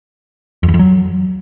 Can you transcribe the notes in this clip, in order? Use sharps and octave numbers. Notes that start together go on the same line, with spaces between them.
F2
E2
F2
F#3